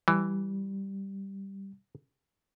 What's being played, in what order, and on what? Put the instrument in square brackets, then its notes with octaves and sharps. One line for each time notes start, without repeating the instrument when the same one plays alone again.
[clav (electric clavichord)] E3 [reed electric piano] G3